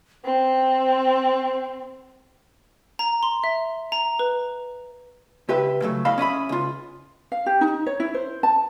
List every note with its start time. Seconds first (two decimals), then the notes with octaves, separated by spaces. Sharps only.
0.25 C4 C5
2.99 A#5
3.23 C6
3.44 E5
3.92 A#5
4.19 B4
5.49 C#2 G4 B4 E5
5.82 C#3 F#3 A3
6.05 A2 D#5 F5 A5 B5
6.18 C#4 D#5 E5 B5
6.49 C#2 F4
7.32 F5
7.46 G4
7.61 D#4
7.86 C#5
8.00 E4
8.14 C5
8.43 A5